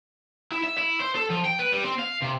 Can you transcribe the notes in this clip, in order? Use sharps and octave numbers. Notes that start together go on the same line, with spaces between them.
E4
E5
E4
C5
A4
F3
G5
B4
G3
C4
F5
C3